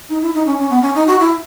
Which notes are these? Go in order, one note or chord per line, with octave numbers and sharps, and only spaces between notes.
D#4
E4
D#4
C#4
C#4
B3
C#4
D#4
F#4
E4